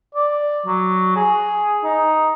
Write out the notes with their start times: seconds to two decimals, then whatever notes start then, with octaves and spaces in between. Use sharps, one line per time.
0.15 D5
0.66 F#3
1.16 G#4
1.84 D#4